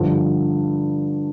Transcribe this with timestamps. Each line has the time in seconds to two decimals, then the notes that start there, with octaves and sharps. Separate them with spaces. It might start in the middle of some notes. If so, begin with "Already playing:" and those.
Already playing: G2 D3 F3